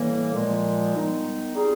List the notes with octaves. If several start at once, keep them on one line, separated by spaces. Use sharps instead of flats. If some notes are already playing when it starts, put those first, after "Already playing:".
Already playing: A2 E3 G3 A#3
A#2 F3 G#3
D#3 G3 B3 D#4
G3 C4 F4 G#4